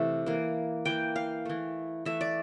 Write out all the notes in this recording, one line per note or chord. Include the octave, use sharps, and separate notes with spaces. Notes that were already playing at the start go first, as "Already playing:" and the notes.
Already playing: C3 E3 A3 E5
E3 A#3
E3 A#3 G5
F5
E3 A3
E3 A3 E5
D5